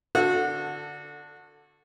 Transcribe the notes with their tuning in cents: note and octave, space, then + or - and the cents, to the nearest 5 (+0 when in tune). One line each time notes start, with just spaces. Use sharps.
D3 +0 F#4 -20 A4 +15